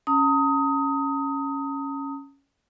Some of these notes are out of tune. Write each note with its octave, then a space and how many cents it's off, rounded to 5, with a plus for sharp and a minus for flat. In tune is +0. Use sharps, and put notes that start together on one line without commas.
C#4 +0 A#5 -40 D#6 +20